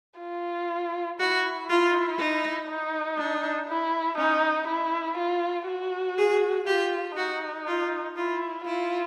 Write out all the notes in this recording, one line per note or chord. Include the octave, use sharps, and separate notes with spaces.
F4
E4 F#4
E4 F4
D#4
D#4
D4
E4
C#4 D#4
E4
F4
F#4
G#4
F4 G4
D#4 F#4
F4
E4 F4
E4 F4